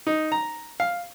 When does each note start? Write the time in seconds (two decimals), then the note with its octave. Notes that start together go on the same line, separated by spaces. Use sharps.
0.07 D#4
0.32 A#5
0.80 F5